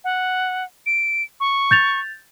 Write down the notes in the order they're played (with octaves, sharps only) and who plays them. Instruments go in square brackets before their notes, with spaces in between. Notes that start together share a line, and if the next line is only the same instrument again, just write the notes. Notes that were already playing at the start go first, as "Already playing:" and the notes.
[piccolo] F#5
D7
C#6
[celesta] G6 A6 F7